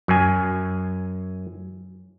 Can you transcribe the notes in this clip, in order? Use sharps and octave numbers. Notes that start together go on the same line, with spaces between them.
F#2 G#5